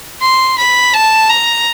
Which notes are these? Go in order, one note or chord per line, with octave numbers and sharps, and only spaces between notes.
C6
B5
A5
A#5